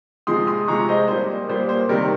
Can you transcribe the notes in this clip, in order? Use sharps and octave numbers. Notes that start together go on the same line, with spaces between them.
C3 F3 G#3 C6 D#6
C6 D#6
C3 F3 G#3 A#5 C#6
C5 D#5
A#2 G3 A#3 C5
A#2 G3 A#3 C5
C5
C3 D#3 G3 A#4